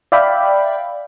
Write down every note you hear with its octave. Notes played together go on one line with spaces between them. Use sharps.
D5 E5 F5 G5 B5